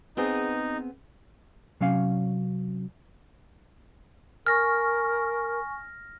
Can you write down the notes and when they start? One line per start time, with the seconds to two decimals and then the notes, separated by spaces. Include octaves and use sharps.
0.17 B3 C4 D#4 G#4
1.81 C3 F#3 C#4 F5
4.47 A#4 G#5 C#6 F6 A#6